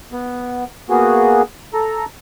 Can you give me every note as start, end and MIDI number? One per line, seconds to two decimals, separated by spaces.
0.13 0.64 59
0.90 1.42 58
0.90 1.42 59
0.90 1.42 66
0.90 1.42 68
1.74 2.05 69
1.74 2.05 82